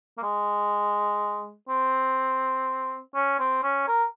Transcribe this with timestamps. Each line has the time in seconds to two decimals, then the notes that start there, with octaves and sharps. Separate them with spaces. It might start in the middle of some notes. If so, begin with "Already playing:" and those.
0.18 A#3
0.23 G#3
1.69 C4
3.15 C#4
3.39 C4
3.63 C#4
3.88 A#4